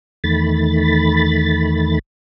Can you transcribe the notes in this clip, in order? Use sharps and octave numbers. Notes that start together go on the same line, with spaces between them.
E2 D#3 A3 B5 A6